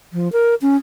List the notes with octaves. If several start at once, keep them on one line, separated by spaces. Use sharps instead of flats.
F3
A#4
C#4